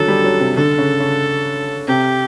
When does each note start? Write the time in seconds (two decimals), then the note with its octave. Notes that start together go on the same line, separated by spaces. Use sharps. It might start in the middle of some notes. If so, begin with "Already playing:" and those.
Already playing: D3 D#3 F#3 A4
0.08 G3
0.24 F#3
0.40 C3
0.56 D3 A4
0.78 C#3
1.00 C#3
1.87 C3 G4